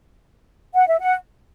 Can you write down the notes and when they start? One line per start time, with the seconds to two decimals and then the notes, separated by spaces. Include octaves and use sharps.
0.74 F#5
0.87 E5
0.99 F#5